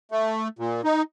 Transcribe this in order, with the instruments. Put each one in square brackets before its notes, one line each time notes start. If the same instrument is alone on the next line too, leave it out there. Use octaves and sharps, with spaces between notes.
[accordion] A3
A#2
D#4